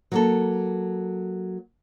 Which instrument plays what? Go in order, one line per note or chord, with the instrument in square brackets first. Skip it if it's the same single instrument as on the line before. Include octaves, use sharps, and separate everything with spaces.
[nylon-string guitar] F#3 A#3 A4